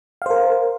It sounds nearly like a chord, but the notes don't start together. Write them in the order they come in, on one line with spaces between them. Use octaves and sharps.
F5 C5 A#4